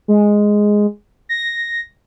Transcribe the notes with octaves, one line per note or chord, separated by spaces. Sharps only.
G#3
A#6